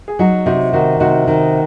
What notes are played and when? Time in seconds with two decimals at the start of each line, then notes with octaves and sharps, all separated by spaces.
0.08 G#4
0.19 F#3 D#4 F#4
0.46 C3 D#4 F#4
0.73 D#3 D#4 F#4
1.00 C3 D#4 F#4
1.27 D#3